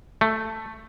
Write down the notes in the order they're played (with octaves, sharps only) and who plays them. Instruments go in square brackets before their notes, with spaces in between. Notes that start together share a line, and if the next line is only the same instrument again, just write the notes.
[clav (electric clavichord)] A3